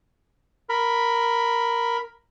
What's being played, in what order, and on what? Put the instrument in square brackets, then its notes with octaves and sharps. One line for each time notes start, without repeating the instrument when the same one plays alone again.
[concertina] A#4 B5